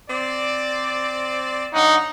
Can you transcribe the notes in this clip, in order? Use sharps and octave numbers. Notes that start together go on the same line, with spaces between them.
C4 C5 D5
G2 D#4 C#5 F#5